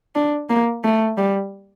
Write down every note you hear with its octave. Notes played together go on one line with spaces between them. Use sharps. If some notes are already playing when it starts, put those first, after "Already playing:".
D4
A#3
A3
G3